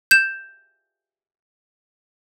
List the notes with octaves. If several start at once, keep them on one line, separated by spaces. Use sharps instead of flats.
G6 E7